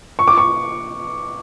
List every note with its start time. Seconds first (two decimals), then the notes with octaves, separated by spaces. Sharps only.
0.19 C#6
0.28 D6
0.37 C#6